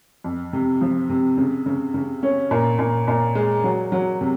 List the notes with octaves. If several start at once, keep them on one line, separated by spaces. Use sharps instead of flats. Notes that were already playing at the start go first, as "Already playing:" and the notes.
F2
C3
F3
C3
C#3
C#3
C#3
C#4
A#2
A#2
A#2
G#3
F#3
F#3
C3